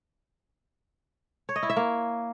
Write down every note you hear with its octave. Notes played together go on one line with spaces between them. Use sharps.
C#5
D#5
E4
E5
A#3